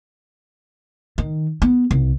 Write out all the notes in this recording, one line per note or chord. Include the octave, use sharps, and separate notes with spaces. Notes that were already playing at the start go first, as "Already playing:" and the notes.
D#3
B3
C2